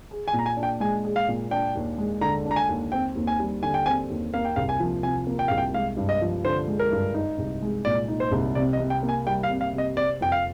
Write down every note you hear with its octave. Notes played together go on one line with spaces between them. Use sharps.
G#4
G#5
A#2
A#5
G#5
D4
G5
G#3 G#5
G#4
F5
A#2
D4 G5
D#2
G#3
D3 A#5
D4
A#5
G#5
D#2
C4 G5
D#2
G#5
G3
D3 G#5
G5
C4 G#5
D#2
A#3 F5
G5
C2 F5
G#5
F3
C3 G#5
A#3
G5
C2 F5
G5
G#3 F5
G2
D#5
F3
D3 C5
G#3
A#4
G2
D#4
C2
G#3
A#2 D5
D#4
C5
C2
C3 D5
D#5
C3
G5
A#3
G#5
G3 G5
F5
C3
F5
C3
D#5
C4 D5
F2 G5
F5